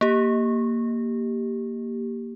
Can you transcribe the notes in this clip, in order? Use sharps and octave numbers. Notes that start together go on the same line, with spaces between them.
A#3 G4